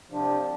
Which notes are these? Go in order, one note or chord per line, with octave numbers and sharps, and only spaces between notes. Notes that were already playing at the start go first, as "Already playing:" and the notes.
C2 C3 F3 D4